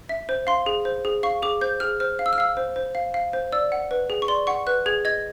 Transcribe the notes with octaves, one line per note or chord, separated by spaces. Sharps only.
E5
C5
F5 C6
G#4
C5
G#4
F5 C#6
G#4 D6
C5 G6
G#4 F6
C5 F6
F5
E6
F6
F5 E6
C5
C5
F5
F5
C5
D5 E6
F#5
B4
G#4
C#6
D5 C6
F#5 C#6
B4 F#6
G#4 G#6
D#5 G#6